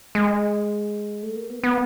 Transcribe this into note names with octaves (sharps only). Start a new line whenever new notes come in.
G#3
A3
A#3
B3
B3